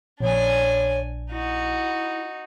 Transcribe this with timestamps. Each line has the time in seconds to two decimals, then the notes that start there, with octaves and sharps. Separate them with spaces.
0.20 A#1 D4 C#5 G#5
1.31 D#4 E4 F#4